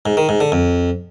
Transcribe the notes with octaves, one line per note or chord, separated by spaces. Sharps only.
G#2
D#3
G#2
D3
F2